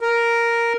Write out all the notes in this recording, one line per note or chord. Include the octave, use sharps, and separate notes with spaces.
A#4